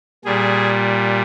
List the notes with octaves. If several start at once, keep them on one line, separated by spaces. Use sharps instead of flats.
A#2 G3 G#4